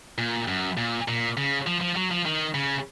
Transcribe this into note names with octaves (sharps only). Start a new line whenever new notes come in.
A#2
F#2
A#2
A#2
C#3
F3
F3
F#3
F3
D#3
C#3